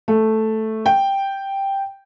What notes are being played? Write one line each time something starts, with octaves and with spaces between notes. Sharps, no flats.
A3
G5